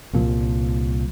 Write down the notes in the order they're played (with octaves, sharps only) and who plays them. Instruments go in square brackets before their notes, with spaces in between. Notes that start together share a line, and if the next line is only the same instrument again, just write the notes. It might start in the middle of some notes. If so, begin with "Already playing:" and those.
[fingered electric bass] C2 A#2 F3